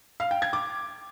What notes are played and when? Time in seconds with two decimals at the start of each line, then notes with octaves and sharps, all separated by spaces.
0.20 F5
0.31 G5
0.42 G#6
0.53 D6